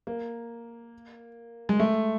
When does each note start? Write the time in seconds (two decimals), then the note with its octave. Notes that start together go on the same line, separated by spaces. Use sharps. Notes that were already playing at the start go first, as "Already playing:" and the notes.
0.07 A#3
1.69 G#3
1.80 A3